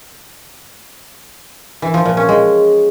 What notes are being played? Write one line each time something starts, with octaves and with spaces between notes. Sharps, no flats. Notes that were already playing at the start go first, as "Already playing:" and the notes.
E3
F3
A#2
C#4
G#3